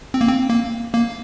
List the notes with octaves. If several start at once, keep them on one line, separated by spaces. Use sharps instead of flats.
C4
A#3
C4
A#3
A#3